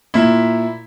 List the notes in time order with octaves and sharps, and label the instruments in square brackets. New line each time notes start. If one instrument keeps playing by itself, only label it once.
[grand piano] A#2 E4